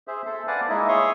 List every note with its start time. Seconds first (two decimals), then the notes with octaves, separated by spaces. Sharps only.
0.08 G#4 C5 E5
0.26 A4 C5 E5
0.47 B4 D5 F5 F#5 G#5 A5
0.69 G#3 A#3 D#4 E4 D#5 E5
0.88 G#4 C#5 E5 C6 C#6 D#6